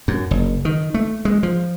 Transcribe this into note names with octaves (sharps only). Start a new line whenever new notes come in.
F#2
F#1
D#3
A3
G#3
F3